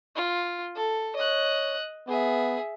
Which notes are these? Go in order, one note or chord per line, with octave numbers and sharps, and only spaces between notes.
F4
A4
C#5 D#5 F#6
B3 G#4 E5